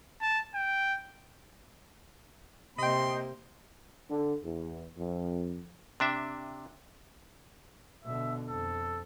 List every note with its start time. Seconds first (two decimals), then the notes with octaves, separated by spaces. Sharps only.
0.21 A5
0.55 G5
2.78 C3 A#3 D#5 G5 C6
4.09 D3
4.42 E2
4.98 F2
6.00 C3 D4 E5
8.04 B2 D3 E5
8.49 F2 A4